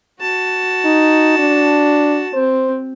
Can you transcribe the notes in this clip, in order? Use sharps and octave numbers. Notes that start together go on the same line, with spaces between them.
F#4 A5
D#4
D4
C4 C5